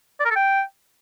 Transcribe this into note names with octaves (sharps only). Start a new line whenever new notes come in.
D5
A#4
A4
G5